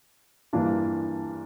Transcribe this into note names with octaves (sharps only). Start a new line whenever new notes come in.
G2 E3 A#3 D4 F4